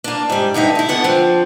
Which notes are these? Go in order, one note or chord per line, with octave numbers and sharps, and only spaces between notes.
A#3 D4
G#2 G3
G2 D3 D#4 E5
D#4 E4
F#2 D3 B3 F#5
F3 C4 D4